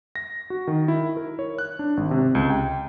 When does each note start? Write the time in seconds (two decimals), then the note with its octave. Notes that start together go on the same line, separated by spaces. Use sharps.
0.16 A#6
0.50 F#4
0.67 D#3
0.88 E4
1.17 A#4
1.39 C#5
1.58 F#6
1.79 D4
1.97 G#1
2.11 C3
2.35 C#2
2.50 G5